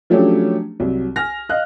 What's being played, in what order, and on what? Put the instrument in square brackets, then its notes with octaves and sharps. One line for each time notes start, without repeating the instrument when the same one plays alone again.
[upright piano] F3 F#3 A3 C#4 D4 G4
C2 F#3
G#5 F6 A#6
D#5 F5 F#6